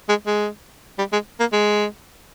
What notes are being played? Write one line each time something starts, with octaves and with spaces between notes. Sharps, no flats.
G#3
G#3
G3
G#3
A#3
G#3